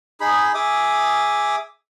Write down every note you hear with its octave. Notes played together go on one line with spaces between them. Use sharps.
D#4 G#4 B5
G#4 E5 D6 D#6